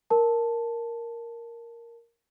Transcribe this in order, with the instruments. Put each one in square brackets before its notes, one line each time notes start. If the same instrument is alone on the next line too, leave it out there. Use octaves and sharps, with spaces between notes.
[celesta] A#4 A5